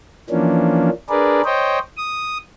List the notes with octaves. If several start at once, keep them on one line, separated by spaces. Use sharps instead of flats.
E3 F3 A#3 C#4 D4
D4 G#4 A#4 B4 D5
C5 C#5 D#5 G5
D#6